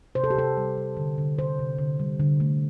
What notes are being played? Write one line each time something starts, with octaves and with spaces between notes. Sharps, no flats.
C3 C5
A4
G4
C3 A4
G3
G3
D3
D3
C3 C5
C3
D3
G3
D3
A3